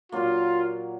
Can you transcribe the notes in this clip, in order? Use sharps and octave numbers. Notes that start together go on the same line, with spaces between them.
A#2 F#3 A#3 F4